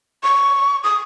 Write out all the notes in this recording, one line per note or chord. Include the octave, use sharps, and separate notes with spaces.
C#6
D#6